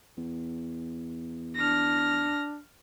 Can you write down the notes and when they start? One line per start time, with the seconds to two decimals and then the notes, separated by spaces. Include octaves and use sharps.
0.17 E2
1.56 D4 F6 A#6